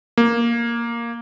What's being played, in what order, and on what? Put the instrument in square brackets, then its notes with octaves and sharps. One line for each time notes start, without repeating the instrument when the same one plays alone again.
[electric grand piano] A#3